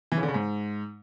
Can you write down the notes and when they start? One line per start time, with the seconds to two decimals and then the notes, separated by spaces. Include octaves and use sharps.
0.12 E3
0.17 C#3
0.23 D3
0.28 C#3
0.34 G#2